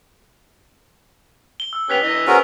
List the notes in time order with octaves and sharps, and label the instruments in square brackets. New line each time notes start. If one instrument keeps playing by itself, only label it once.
[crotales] G7
E6
[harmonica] B3 C#4 G4 [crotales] F#6 B6 F7
[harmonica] E3 D#5
[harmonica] B3 G#4 C5 [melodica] C#4 F#4 A#4